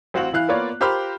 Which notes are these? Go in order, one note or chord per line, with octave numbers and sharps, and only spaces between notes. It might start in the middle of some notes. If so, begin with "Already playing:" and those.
A1 C4 F#4 F5 F#5 F#7
E3 E4 F5 F#6
A#3 B3 F4 C#5 D5
F4 G4 A#4 C5 B5 F6